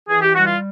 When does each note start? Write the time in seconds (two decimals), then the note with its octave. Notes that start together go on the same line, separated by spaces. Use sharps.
0.09 E3 G#4
0.21 G4
0.33 G3 F#4
0.45 F4